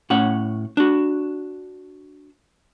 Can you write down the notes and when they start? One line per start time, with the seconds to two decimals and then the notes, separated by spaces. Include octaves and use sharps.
0.10 A2 C#4 F#5
0.77 D4 F#4